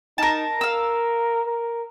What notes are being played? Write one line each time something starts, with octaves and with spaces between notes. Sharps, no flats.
D#4 A#4 A5
A#4 F5 E6
A#4